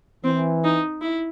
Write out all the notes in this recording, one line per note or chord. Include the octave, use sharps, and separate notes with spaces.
E3 C4
D#4
E4